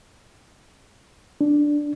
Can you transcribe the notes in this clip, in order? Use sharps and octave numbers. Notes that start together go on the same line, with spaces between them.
D4